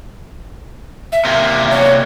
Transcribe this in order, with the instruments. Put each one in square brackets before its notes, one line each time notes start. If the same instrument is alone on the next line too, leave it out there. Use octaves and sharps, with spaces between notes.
[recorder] E5
[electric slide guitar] C3 A#3
[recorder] C#5